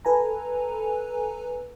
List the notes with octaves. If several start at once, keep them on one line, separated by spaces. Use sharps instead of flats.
A4 B4 G#5 A#5